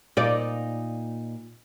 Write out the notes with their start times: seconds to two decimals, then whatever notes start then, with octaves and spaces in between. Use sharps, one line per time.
0.17 A#2 D#4 D5